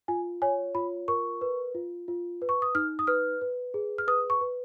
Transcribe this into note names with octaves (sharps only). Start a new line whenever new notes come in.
F4 G#5
C#5 G#5
F4 B5
A#4 C#6
B4
F4
F4
B4
C#6
D#6
D#4 F6
D#6
B4 F6
B4
G#4
F6
B4 D#6
C#6
B4